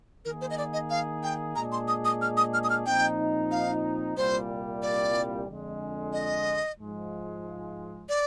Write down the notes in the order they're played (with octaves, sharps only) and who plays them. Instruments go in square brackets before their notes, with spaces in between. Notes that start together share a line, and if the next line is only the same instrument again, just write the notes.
[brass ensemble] D#3 A#3 D#4 G#4 [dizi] A#4
[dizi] C5
D#5
D5
D#5
F5
G5
[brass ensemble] A#2 G#3 D4 G#4 [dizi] A#5
[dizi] C6
D#6
D#6
F6
D#6
F6
D#6
F6
[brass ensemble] A#2 F3 C4 D#4 [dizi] G5
[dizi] F5
[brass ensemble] C2 A#2 G3 [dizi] C5
[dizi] D5
[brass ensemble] F2 D3 G#3
[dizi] D#5
[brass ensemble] G#2 F3 G#3
[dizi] D5